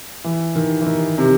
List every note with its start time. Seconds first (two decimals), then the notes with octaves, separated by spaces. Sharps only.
0.24 E3
0.55 D#3
0.81 E3
0.86 D#3
1.18 C3